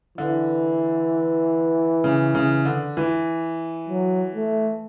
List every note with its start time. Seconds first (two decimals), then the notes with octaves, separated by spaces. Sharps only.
0.18 D3 E3
2.04 C#3
2.35 C#3
2.65 D3
2.97 E3
3.89 F#3
4.36 A3